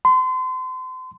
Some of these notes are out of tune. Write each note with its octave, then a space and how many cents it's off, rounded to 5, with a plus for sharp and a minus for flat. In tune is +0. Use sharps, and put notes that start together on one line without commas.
C6 -35